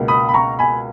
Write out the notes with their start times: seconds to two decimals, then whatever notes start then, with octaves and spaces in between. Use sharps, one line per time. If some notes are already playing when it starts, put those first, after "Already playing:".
Already playing: C#2 B2 A#3
0.08 B5 D#6
0.29 B5
0.34 A#5 C#6
0.59 G#5 B5